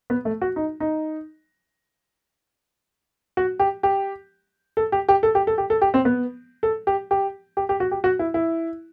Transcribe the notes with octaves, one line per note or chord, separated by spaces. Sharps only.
B3
A3
F#4
D#4
D#4
F#4
G4
G4
A4
G4
G4
A4
G4
A4
G4
A4
G4
C4
B3
A4
G4
G4
G4
G4
F#4
G4
F#4
E4
E4